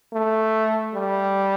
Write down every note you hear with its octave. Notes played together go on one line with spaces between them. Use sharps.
A3
G3